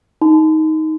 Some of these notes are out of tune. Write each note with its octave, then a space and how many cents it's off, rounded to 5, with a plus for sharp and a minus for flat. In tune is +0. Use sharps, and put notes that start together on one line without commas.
D#4 +15 C6 -40